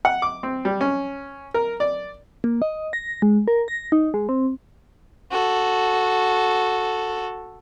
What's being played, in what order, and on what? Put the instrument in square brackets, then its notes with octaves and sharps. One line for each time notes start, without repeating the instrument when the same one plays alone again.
[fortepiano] F#5
D6
C4
G3
C#4
A#4
D5
[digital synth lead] A#3
D#5
A#6
G#3
A#4
A#6
D#4
G#3
C4
[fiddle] F#4 A4